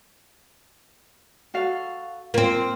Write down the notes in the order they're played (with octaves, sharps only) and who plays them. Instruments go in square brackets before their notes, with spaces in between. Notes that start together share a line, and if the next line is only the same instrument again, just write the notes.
[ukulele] F#4 A4 F5
[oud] A#3 C4 [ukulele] F4